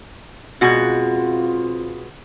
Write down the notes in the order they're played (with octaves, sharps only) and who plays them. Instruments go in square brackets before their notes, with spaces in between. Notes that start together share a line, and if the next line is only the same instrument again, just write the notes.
[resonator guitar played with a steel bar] B2 G#3 F#4 [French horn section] C4 F4